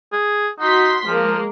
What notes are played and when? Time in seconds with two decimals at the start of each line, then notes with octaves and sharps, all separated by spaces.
0.12 G#4
0.60 D#4 F#4 C6 B6
1.07 F3 G#3 A#3